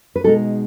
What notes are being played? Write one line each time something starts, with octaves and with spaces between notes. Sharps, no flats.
B4
B2 G#3 D#4 A4